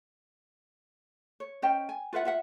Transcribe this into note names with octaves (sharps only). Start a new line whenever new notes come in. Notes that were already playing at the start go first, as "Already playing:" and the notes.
C#5
C#4 C5 D#5 G5
G#5
F4 B4 E5 F#5
F4 E5 F#5